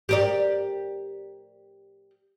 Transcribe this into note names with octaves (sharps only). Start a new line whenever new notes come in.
G4 A#4 D5